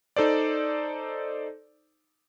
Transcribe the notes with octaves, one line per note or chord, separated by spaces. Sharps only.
D#4 A4 C5 D5